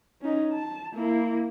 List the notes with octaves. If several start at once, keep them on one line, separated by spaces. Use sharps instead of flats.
C#4 D#4
A5
A#3 E4